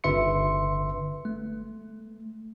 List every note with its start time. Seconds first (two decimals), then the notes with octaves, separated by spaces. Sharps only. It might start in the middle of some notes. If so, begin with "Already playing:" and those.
0.04 G1 D3 B4 E5 C6 C#7
1.25 A3